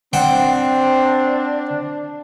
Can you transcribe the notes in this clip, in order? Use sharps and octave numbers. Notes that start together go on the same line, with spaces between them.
C4 D4 C5 F#5 G5